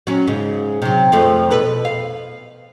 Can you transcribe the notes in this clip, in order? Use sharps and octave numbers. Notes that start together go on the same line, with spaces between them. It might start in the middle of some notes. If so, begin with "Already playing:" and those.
F#3 C#4
G#2 C#3
C3 F#3
F2 F3 A3
B2 A4 B4
F5